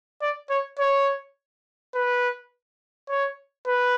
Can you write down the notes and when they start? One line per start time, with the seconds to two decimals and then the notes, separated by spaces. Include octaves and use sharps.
0.22 D5
0.50 C#5
0.79 C#5
1.95 B4
3.10 C#5
3.67 B4